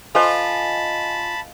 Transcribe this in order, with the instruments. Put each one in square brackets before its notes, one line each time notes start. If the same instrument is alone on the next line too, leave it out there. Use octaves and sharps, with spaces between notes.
[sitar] F4 [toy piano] A4 C5 [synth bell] D#5 G#5 [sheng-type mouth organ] A5 B5